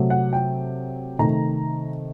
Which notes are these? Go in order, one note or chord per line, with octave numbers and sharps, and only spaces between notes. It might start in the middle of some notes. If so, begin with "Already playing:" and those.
Already playing: C3 F#3 A3
F#5
G5
C3 D#3 A3 A#5